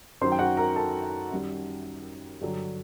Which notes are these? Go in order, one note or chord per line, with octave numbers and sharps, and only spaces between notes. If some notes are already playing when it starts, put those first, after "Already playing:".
F#2 D#3 F#3 C5 C6
G5
F#4 F#5
A#4 A#5
A4 A5
F#2 D#3 G3
G2 D3 F#3